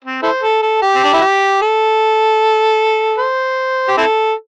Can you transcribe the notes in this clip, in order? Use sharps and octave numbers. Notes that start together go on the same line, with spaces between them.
C4
E4 A4 C5
A4
A4
G4
C4
D4
E4
G4
A4
C5
G4
C4 E4 A4